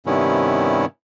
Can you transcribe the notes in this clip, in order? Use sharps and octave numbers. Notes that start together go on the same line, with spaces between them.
G2 C3 D#3 B3 C#4 E4